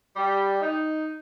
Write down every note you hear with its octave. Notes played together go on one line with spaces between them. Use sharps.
G3
D#4